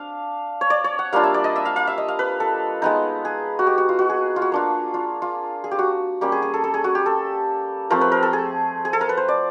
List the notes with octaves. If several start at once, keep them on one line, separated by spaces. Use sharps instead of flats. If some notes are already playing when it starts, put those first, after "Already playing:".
Already playing: D4 F5
C#5
D5
C#5
F#5
G3 A#3 D4 F4 F5
E5
D5
D#5
E5
F5
F5
E5
D#5
F5
B4
A4
G#3 B3 D#4
G#4
F#4
G4
F#4
F4
F#4
G#4
F4
F#4
A#3 D4 F4
F4
F4
G#4
G4
F#4
G3 A#3 C#4 G4
G#4
G#4
A4
A4
G#4
F#4
G4
A4
F3 A3 C4 A#4
B4
A#4
A4
G#4
G#4
A4
A#4
B4
C5
D5